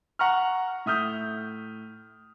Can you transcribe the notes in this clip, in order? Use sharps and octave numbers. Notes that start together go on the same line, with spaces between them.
F#5 A#5 C#6 F6
A2 E5 D#6 F6 G6